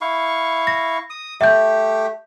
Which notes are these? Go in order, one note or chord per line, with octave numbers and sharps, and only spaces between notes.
E4 F5 C#6
A#6
D#6
A3 G4 E5 G6